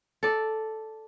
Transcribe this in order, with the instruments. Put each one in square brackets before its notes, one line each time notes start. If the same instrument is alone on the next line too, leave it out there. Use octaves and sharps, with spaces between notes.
[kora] A4 D5